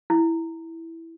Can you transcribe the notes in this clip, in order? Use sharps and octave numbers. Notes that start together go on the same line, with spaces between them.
E4